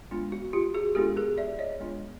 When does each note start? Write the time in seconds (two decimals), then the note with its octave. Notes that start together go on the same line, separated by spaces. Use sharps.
0.11 G#3 B3 D4 F4
0.32 F#4
0.53 F4 G4
0.74 F#4 G#4
0.95 G#3 B3 D4 F4 G4 A4
1.16 G#4 A#4
1.38 D5 E5
1.59 C#5 D#5
1.80 G#3 B3 D4 F4